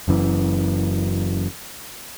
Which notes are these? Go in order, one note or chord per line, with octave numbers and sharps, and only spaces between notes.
F#1 F#2 E3